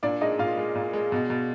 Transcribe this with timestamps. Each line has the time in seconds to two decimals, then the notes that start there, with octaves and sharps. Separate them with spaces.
0.03 A#2 D4 D5
0.21 G#3 D#4 D#5
0.39 A#2 F4 F5
0.57 G#3
0.75 A#2
0.93 G#3
1.12 B2
1.30 B2